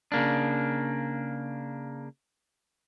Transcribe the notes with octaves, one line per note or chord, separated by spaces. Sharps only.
C#3 A#3 D4